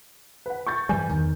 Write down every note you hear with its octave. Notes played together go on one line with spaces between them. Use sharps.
B4 F#5
C#6 G6 A6
G2 E3 G3 G#5 G6
E2 D#3